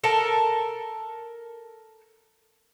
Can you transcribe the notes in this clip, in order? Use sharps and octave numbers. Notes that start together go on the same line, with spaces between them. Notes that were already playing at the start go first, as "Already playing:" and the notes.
A4 A#4 A5